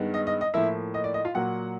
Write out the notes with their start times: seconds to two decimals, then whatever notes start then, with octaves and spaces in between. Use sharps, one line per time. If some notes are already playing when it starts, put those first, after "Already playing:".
Already playing: G2 D#3 G#3 B3
0.14 D#5
0.27 D#5
0.41 D#5
0.54 A2 F3 A#3 E4 E5
0.94 D#5
1.04 D5
1.14 D#5
1.25 F4 F5
1.34 A#2 F#3 A#3 F#4 F#5